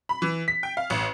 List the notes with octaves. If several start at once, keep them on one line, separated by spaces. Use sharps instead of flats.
B5
E3
B6
G5
F5
A1